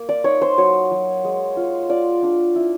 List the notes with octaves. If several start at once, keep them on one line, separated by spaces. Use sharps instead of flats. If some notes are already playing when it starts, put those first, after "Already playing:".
Already playing: A#3
D5
D#4 C#5
C5
F#3 C#5
F#3
G#3
F4
F4 D5
D4
E4